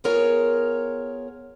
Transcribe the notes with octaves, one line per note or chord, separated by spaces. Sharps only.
B3 F4 G#4 A#4 C#5